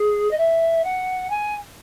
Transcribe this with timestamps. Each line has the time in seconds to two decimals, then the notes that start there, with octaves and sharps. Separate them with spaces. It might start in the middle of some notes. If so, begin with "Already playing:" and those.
Already playing: G#4
0.30 D#5
0.37 E5
0.84 F#5
1.30 G#5